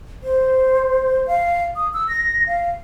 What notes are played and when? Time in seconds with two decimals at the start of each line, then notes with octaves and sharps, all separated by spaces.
0.23 C5
1.27 F5
1.76 D#6
1.94 E6
2.08 A#6
2.47 F5